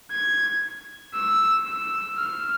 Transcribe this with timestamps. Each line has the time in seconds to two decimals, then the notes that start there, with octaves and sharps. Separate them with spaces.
0.11 G#6
1.14 E6
1.65 E6
2.17 F6